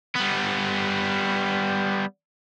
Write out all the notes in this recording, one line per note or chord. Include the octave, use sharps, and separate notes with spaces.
G3 B3